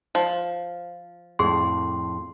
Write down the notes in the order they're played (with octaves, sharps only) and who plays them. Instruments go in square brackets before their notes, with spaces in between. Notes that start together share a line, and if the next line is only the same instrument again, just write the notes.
[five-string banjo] F3
[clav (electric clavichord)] F2 A2 [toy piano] G#4 [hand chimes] C6